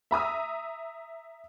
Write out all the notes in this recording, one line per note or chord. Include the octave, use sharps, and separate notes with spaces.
E5 A#5 D#6 E6